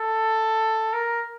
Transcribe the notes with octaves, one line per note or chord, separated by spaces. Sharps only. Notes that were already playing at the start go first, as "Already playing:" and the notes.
Already playing: A4
A#4